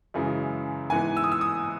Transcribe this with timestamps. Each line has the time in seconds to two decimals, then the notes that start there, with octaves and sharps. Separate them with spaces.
0.14 F#2 C#3 E3 G#3
0.90 G#2 E3 B3 G#5
1.17 E6
1.24 D#6
1.32 E6
1.41 D#6